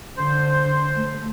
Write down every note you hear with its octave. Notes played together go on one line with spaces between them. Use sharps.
D3 C5
A3